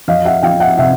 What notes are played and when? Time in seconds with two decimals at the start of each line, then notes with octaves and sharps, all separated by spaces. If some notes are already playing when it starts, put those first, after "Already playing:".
0.08 F2 D#5 F5
0.25 E5 F#5
0.43 F3 F5 G5
0.60 E5 F#5
0.78 C3 E5 F#5